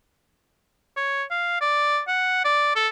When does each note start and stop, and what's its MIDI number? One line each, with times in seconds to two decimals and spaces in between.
0.97 1.23 73
1.31 1.57 77
1.61 2.00 74
2.08 2.44 78
2.45 2.71 74
2.76 2.88 69